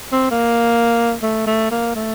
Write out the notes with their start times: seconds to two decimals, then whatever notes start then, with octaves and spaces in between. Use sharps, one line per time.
0.12 C4
0.31 A#3
1.23 A3
1.47 A3
1.71 A#3
1.95 A3